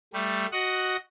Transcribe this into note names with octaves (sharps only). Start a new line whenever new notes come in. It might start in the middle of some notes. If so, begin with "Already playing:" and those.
G3 A3
F#4 D#5 F#5